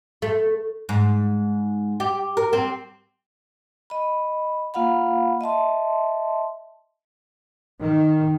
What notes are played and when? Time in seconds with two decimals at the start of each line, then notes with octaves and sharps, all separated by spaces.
0.22 A3
0.89 G#2
2.00 G4
2.37 A#4
2.53 C4
3.90 D#5 B5
4.74 A#3 F4 F5 F#5 B5
5.41 D#5 E5 A5 C6
7.82 D#3